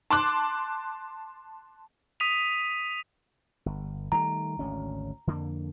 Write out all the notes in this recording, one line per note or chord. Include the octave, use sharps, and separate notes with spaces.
A5 C6 D6 F#6
D#6 B6 D#7 F7
G1
D#3 G3 A3 A#5
G#1 D2 C#4
F2 D3 A#3